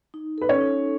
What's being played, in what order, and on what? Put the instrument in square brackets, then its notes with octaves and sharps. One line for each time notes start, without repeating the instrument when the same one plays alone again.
[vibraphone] D#4
[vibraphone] A4 [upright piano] B4
[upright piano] C#4 C#5
[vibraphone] D#4